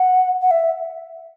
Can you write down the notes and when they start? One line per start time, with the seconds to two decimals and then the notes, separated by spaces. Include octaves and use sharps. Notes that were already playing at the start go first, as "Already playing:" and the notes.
Already playing: F#5
0.42 F#5
0.51 E5